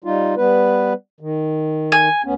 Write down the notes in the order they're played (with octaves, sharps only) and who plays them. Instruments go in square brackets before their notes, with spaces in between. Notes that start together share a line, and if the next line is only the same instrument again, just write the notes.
[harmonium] G3 D#4 F4
G3 B3 B4
D#3
[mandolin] G#5
[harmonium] D2 B3 C#4